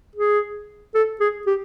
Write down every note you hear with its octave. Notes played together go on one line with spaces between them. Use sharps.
G#4
A4
G#4
G4